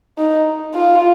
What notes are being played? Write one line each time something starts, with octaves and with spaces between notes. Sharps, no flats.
D#4
F4